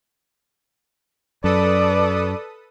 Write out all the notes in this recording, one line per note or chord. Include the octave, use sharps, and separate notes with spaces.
F#2 A4 B4 D5 D#6